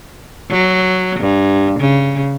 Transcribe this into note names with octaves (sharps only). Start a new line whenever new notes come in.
F#3
G2
C#3